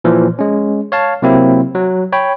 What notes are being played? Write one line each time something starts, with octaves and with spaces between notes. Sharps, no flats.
A#2 E3 F3
G#3 C#4
C#5 F5 A5
C3 F#3 A#3 C4 E4
F#3
C#5 G5 B5